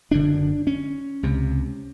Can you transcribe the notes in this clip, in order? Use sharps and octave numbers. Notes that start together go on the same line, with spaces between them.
F#1 F#2 D3 D4
C#4
C#2 C3